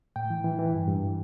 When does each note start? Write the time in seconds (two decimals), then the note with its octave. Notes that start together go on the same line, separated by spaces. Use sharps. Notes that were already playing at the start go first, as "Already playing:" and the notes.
0.16 A2 G5
0.30 E3
0.44 E3
0.59 E3
0.73 G2
0.88 G2